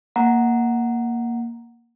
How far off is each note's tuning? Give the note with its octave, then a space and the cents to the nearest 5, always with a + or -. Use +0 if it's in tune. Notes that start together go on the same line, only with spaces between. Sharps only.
A#3 +0 F#5 +0 A#5 +0